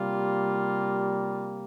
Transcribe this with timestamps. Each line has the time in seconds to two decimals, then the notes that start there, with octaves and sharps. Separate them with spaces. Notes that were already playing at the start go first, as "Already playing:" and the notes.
Already playing: C3 G3 A#3 F4